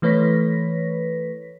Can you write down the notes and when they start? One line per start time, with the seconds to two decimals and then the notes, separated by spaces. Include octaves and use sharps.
0.02 E3 A3 B4 C#5 A#6 B6